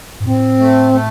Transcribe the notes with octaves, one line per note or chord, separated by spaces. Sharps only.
G#2
A2 C4
A3
A3